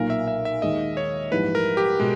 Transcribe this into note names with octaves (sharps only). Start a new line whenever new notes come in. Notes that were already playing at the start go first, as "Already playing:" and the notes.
Already playing: B1 A#2 A#3 A#4
E5
E5
E5
D#2 D#3 G#3 D#5
C#5
A#1 G#2 E3 G3 B4
A#4
G4
B2 G#3